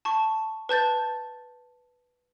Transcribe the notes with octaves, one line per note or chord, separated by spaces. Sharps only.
A5 C#6
B4 A5 G6 A6